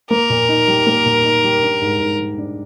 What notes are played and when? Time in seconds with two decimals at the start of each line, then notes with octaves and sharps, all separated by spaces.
0.11 A#3 A#4
0.30 A#2
0.49 D#4
0.68 G3
0.86 A#3
1.05 A#2
1.24 D#4
1.44 G3
1.62 D4
1.81 G#2
2.00 G#2
2.19 G3
2.38 D4